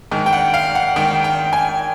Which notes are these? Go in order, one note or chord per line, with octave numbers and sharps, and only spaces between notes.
G#2 D#3
G5
F#5
F5
F#5
G#2 D#3 G5
G5
G#5